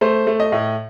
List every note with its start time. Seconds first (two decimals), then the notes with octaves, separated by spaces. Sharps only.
0.01 A3 C5
0.27 A3
0.40 D#5
0.52 A2